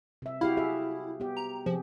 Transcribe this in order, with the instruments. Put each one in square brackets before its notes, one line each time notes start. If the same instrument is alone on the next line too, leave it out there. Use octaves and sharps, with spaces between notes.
[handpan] C3 E5
[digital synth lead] E4 [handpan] F#4 G4 F5
[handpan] F#4 G#4 E5
B3 G4
[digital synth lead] A#5
[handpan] C3 G4 G#4 [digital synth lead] F3